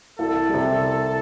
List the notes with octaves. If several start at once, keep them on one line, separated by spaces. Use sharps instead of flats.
C2 A4
C3 G3